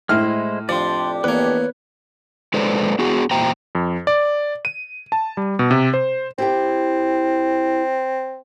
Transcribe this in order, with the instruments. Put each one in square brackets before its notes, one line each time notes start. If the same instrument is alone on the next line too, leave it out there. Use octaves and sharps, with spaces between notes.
[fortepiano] A2 F6 [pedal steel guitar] G#3 E4 C5
[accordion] F2 D4 G4 [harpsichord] F3 [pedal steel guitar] D5 C6
[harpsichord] E2 A#3 [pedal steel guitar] B4 C#5
[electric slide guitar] G#3 A4 B4 C5 D5
B3 F#4 G#4
E2 A#2 C5 G5 A#5
[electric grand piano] F2
D5
D#7
A5
G3
B2
C3
C5
[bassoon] C4 [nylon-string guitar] E4 G4 G5